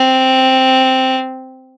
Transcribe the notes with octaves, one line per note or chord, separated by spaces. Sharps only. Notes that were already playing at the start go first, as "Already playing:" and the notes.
Already playing: C4